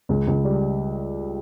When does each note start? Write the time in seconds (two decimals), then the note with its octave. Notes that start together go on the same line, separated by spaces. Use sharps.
0.09 C#2
0.27 C#2
0.44 G3